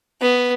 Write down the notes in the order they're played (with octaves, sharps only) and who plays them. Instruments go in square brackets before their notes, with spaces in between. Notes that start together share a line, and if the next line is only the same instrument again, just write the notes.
[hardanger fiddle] B3